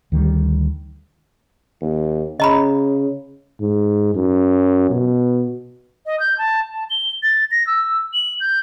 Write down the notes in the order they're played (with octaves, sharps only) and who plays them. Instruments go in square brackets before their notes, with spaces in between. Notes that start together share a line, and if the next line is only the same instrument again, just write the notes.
[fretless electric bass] D2 D#3 E3 G3
[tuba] D#2
[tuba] C#3 [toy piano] D#5 A#5 B5
[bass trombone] G#2
F#2
B2
[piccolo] D#5
G6
A5
A5
G7
A6
A#6
E6
F#7
G6